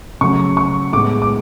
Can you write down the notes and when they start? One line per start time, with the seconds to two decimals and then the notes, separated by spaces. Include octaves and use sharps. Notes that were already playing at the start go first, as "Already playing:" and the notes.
0.21 C#3 F#3 A3 C#6
0.57 C#6
0.92 A2 G#3 B3 D6
1.22 D6